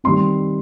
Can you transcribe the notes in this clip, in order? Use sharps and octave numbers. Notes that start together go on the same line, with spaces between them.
D#3 G3 C4 C6